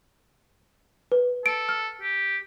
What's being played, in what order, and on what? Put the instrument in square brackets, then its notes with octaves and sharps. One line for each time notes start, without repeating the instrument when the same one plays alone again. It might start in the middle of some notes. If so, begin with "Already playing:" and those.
[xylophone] B4
[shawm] A4 [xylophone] D7
[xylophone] F6
[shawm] G4